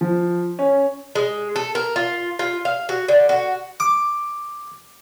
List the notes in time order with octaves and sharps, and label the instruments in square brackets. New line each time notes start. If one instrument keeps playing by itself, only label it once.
[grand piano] F3
C#4
[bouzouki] G#3
A4
A#4
F4
F4
F5
F#4
D3
F#4
[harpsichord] D6